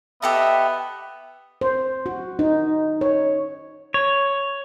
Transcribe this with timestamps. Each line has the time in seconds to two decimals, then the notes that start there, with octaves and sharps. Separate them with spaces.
0.22 B3 G4 A4 D#5 E5
1.61 C5
2.06 F#4
2.39 D#4
3.01 C#5
3.94 C#5